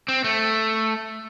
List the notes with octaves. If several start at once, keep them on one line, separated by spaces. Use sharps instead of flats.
C4
A3